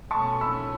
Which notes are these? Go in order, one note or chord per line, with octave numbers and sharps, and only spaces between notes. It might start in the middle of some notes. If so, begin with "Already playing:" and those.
B1 B2 A3 C#4 A5 C#6
B5 E6